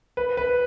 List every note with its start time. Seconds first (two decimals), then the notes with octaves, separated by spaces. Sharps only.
0.17 B4
0.37 B4